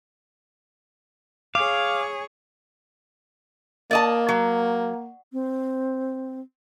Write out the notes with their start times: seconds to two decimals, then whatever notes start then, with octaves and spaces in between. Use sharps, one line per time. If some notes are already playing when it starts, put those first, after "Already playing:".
1.55 G#4 C#5 F5 D6
3.91 A#3 D5 D#5 A5
4.29 F#3
5.33 C4